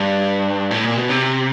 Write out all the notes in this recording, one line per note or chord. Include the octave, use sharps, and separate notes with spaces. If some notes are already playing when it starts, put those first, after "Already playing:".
Already playing: G2
A2
A#2
B2
C3